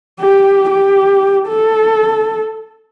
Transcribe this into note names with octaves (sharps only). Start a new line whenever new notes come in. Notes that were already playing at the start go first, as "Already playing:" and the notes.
G4
G4
A4